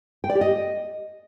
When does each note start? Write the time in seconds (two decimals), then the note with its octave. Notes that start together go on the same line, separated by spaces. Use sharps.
0.24 G5
0.30 D5
0.35 G4
0.41 D#5